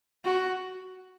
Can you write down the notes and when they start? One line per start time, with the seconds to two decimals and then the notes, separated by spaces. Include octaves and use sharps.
0.24 F#4